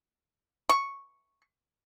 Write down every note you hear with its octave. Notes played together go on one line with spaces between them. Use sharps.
C#6